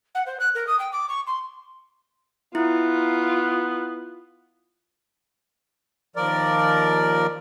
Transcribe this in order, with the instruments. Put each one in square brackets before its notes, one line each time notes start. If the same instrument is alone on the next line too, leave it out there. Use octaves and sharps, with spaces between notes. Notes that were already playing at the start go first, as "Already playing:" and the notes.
[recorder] F#5
C5
F#6
A#4
D#6
G5
D6
C#6
C6
[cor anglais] B3 [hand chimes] E4 [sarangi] F4
[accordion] D#2 F3 A#4 D5